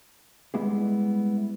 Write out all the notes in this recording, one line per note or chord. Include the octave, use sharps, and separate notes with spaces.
G3 G#3 B3 E4 G4 G#4